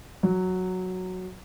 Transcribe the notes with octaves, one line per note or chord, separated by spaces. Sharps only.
F#3